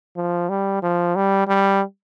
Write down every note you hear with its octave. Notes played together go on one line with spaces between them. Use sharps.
F3
G3
F3
G3
G3